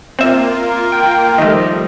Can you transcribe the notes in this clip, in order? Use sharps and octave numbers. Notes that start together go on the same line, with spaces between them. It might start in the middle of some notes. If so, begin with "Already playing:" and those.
A#3 C4 F4 E5
A#4
G5
D#3 F3 G3 A3 D#5